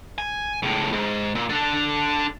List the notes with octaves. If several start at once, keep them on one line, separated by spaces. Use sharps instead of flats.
G#5
C#2 A2
G#2
A#2
D4 A4